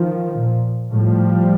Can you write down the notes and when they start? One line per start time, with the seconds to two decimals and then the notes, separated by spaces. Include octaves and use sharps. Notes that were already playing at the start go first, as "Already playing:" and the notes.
Already playing: D#3 F3
0.38 A#2
0.91 A2 F3 G3